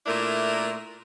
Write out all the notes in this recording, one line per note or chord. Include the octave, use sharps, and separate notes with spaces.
A#2 A3 D4 E4 A#4